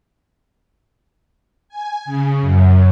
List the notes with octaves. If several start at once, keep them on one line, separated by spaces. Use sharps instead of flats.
G#5
C#3
F#2